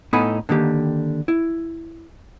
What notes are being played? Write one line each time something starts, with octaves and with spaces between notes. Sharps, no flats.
A2 B3 D#4 A4 G#5 B5
D3 D#3 A#3 G4
E4